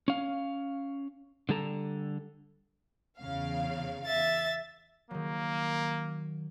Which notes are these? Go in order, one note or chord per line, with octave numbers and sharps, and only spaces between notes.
C#4 F5
D3 G3 A4 A#5
E2 C#3 F5
E5 A6
D#3 F#3 A#3